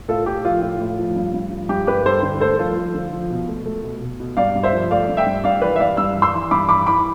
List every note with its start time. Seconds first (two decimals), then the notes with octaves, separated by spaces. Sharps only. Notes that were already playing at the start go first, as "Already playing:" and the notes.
0.08 A2 F4 A4
0.26 A2 G4
0.45 F3 F4
0.62 A2 F4
0.80 A2
0.99 F3
1.16 G2
1.34 G2
1.51 F3
1.69 G2 G4
1.87 G2 G4 B4
2.06 G2 A4 C5
2.23 D3
2.40 A3 A4 C5
2.58 F3 F4 A4
2.77 F3
2.94 D3
3.12 F3
3.30 B2
3.48 A3
3.66 A3
3.83 B2
4.01 B2
4.20 B2
4.37 G2 D5 F5
4.55 G2
4.63 C5 E5
4.73 F3
4.91 A3 D5 F5
5.09 G2
5.17 E5 G5
5.26 G2
5.44 G2 D5 F5
5.62 E3 B4 D5
5.76 E5
5.80 G3 D5 F5
5.97 G2 E6
6.15 E3
6.22 C6 E6
6.34 E3
6.51 G2 B5 D6
6.69 E3 B5 D6
6.87 E3 B5 D6